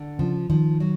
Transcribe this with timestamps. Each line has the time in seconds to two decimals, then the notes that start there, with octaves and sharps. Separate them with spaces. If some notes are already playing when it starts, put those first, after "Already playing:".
Already playing: D3
0.19 C#3 F3
0.50 D#3 F3
0.80 F#3